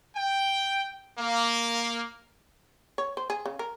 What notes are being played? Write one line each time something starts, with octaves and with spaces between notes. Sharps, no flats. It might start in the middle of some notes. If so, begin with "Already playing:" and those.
G5
A#3
C#5
C5
G#4
C#3
A#4